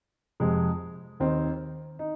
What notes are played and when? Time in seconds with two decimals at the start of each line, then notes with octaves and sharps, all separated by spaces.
0.40 F2 C3 G#3
1.20 D#2 D#3 C4 D#4
1.99 D#4